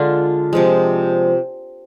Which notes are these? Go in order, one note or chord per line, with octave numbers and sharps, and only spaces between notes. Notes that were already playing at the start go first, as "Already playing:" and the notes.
Already playing: D3 G#3 D4 F4
C3 F3 G#3